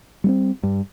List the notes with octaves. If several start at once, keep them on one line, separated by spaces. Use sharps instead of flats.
G3 B3 C4
G2